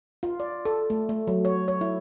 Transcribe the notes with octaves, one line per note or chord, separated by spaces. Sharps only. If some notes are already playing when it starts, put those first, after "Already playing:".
F4
D5
A4
A3
A3
F#3
C#5
C#5
E4